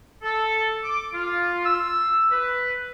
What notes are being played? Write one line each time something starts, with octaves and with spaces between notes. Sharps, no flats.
A4
D6
F4
E6
B4